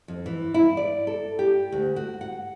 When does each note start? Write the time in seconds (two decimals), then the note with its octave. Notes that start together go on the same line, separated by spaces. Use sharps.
0.08 F2
0.26 E3
0.54 E4
0.77 D5
1.07 A4
1.39 G4
1.72 D2
1.96 F#4
2.21 F#5